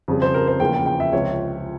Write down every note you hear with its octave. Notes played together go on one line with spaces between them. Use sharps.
F2 C#3 G3
C5
A#4
C5
E2 C#3 F3 A#3 G5
G5
G5
E5
C#2 C3 F3 C4 C#5